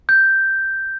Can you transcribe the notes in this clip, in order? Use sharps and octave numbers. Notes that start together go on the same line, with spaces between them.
G6